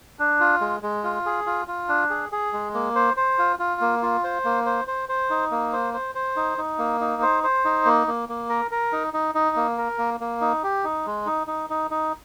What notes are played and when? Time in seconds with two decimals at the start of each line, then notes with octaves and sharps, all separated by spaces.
0.19 D4
0.40 F4
0.61 G#3
0.82 G#3
1.04 F4
1.26 G#4
1.46 F4
1.68 F4
1.89 D4
2.10 G#4
2.32 G#4
2.53 G#3
2.74 A#3
2.95 C5
3.17 C5
3.38 F4
3.59 F4
3.81 A#3
4.02 F4
4.24 C5
4.45 A#3
4.66 C5
4.87 C5
5.09 C5
5.30 D#4
5.51 A#3
5.73 C5
5.93 C5
6.15 C5
6.36 D#4
6.58 D#4
6.79 A#3
7.01 D#4
7.22 C5
7.43 C5
7.65 D#4
7.85 A#3
8.07 A#3
8.29 A#3
8.49 A#4
8.71 A#4
8.92 D#4
9.14 D#4
9.35 D#4
9.56 A#3
9.78 A#4
9.98 A#3
10.20 A#3
10.41 D#4
10.63 G4
10.84 D#4
11.06 G#3
11.26 D#4
11.47 D#4
11.70 D#4
11.91 D#4